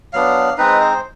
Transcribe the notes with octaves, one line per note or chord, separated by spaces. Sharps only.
F#3 B3 D4 F5
G#3 C4 D#4 B4
C5